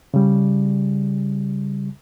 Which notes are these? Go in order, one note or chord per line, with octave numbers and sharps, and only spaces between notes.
C#3 G3